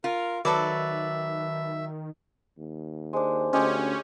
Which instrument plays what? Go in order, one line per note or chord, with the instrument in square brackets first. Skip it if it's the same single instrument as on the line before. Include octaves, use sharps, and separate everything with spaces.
[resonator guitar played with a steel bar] F4 [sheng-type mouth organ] A#4
[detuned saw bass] D#3 [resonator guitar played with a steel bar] F#3 [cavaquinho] A4 B4 D5 [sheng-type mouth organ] E5
[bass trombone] D#2
[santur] G#3 D4 [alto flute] C5
[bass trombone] D2 [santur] G#3 G4 C#5 [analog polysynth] C#4